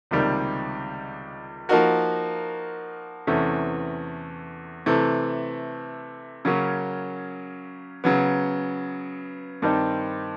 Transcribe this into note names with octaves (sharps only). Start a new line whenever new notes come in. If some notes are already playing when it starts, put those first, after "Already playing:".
C#2 C3 D#3 G3 A#3
F3 A#3 D#4 F#4 A#4
E2 C3 E3 A3 C#4
C3 E3 A3
C#3 F#3 A#3 C#4
C#3 F#3 B3
G2 D#3 G3 C4 D#4